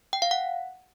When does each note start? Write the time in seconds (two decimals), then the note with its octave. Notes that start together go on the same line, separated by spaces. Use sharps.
0.13 G5
0.22 F5
0.31 F#5